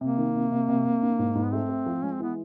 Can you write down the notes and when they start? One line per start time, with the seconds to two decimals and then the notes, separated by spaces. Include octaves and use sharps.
0.01 C3 A#3
0.18 D#3
0.35 C3
0.51 C3
0.69 C3
0.85 C3
1.02 D4
1.19 G#2
1.35 G#2
1.45 B3
1.52 A3 C4
1.69 A3
1.86 F3
2.03 G#3 C#4
2.14 C4
2.20 E3 B3